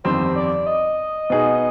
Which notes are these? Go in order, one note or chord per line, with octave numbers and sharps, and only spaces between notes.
G1 F2 D#3 G3 C4 C5
D5
D#5
B2 B3 D#4 G#4